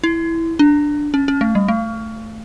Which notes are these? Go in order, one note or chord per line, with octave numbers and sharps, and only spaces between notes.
E4
D4
C#4
C#4
A3
G3
A3